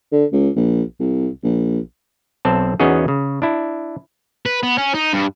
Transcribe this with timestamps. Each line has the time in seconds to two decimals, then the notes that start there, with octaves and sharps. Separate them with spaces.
0.12 D3
0.33 C#2
0.56 A#1
1.00 C2
1.44 A#1
2.45 B1 C4 A5
2.80 E2 B3 C#4 D#4 F#4 G#4
3.08 C#3
3.42 D4 E4
4.46 B4
4.63 B3
4.78 C#4
4.94 D#4
5.13 G2